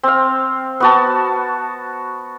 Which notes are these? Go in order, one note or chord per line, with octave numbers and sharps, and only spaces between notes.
C4 F5
B3 F#4 A5